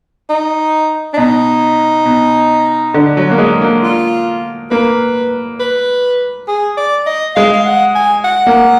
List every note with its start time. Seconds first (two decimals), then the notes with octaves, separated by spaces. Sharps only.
0.29 D#4
1.14 D4
1.18 B2 D#4
2.06 B2
2.94 D3
3.17 F#3
3.31 A#3
3.38 G#3
3.61 A#3
3.83 F4
4.71 A#3 B4
5.60 B4
6.48 G#4
6.77 D5
7.06 D#5
7.36 G#3 F5
7.53 F5
7.65 F#5
7.95 G#5
8.25 F#5
8.47 A#3